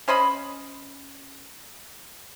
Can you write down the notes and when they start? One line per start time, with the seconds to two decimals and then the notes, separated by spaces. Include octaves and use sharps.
0.08 C#4 C5 D#5 B5